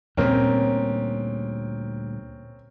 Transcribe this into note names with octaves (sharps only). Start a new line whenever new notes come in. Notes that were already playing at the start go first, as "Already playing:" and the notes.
D2 A#2 G3 C4 C#4 A#4